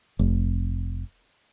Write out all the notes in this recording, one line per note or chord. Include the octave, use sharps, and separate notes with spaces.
F1